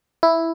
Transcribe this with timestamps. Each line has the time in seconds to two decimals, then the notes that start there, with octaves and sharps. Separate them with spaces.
0.23 E4